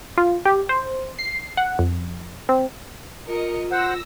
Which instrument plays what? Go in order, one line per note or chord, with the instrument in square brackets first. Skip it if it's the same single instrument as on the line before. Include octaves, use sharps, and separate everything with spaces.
[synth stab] F4
G4
C5
C7
F#5
F2
C4
[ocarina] F4 [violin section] A#4 D#5 C#7
[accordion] C5 F#5 [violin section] E6 A#6